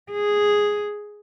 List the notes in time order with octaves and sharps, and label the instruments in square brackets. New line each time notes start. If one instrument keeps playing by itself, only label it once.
[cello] G#4